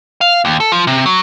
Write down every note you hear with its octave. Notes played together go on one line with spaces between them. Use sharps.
F5
D#2
A4
F3
C3
F#3